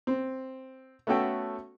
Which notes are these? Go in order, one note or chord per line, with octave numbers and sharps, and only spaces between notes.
C4
A3 B3 C#4 F#4 A4 G5